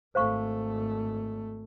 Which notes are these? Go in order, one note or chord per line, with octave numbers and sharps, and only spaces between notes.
G#1 A3 C5 F5 C#6